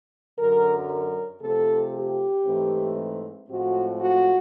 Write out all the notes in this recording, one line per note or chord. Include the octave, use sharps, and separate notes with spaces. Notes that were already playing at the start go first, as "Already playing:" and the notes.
F#2 D3 F#3 A#4
A#4
C3 F3 A3 C4 A4
G4
G#2 E3 A3 C4
A2 F3 G#3 C4 F#4
F#4